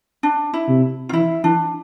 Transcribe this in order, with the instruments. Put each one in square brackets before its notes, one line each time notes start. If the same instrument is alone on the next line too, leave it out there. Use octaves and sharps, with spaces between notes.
[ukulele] D4
E4
[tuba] C3
[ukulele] F4
[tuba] E3 [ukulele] E4
[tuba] E3 [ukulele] D4